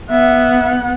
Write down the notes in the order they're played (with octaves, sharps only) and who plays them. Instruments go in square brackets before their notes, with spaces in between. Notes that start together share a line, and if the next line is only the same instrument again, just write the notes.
[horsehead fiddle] B3 F#5 [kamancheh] E5